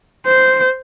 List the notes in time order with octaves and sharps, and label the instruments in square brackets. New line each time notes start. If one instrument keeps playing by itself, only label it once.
[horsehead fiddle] C5